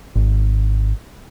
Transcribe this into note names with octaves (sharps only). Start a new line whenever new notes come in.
G#1